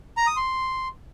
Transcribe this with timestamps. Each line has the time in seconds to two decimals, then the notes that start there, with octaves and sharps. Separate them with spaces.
0.17 A#5
0.27 D#6
0.36 C6